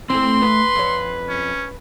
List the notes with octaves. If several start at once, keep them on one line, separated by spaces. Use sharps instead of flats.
E3 A3 C4 C6
B4
F2 C#5
C#4